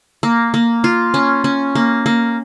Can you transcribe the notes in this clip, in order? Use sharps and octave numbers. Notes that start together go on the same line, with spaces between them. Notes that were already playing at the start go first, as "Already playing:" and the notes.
A#3
A#3
F4
C#4
C#4
A#3
A#3